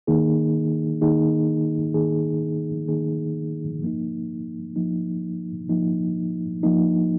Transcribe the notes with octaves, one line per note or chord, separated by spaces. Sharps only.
D#3 A#3 D#4 G#4
D#3 A#3 D#4 G#4
D#3 A#3 D#4 G#4
D#3 A#3 D#4 G#4
F3 A#3 D#4
F3 A#3 D#4
F3 A#3 D#4
F3 A#3 D#4